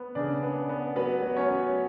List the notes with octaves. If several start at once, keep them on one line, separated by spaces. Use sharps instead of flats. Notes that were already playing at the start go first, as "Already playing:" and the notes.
Already playing: B3
C#3 D4 D5
B3
B3
F#3 B3 B4
F#3
C#4 C#5
F#3